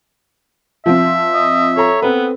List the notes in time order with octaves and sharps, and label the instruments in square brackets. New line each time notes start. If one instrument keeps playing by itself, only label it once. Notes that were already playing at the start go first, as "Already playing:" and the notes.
[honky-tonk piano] F3 C4 [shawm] E5
[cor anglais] D#5
[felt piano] A4 A#5 [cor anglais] C#5
[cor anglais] B3 [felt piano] C4 A4 B4